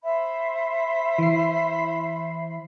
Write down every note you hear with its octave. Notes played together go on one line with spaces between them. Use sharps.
C5 E5 B5
E3 C7